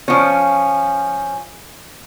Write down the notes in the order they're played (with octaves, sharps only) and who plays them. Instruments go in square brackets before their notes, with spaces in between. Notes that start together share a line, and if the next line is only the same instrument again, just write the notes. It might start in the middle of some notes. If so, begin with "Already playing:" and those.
[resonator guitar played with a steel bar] F3 C#4